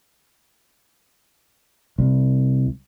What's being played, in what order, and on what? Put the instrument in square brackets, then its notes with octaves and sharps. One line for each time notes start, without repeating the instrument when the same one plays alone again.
[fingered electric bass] C2